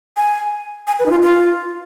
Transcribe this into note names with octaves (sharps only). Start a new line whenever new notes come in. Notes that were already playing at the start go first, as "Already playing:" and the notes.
G#5
G#5
B4
D#4
F4
F4